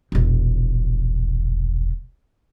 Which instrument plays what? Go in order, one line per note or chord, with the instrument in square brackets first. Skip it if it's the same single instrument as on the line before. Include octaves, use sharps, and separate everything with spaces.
[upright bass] E1 A#1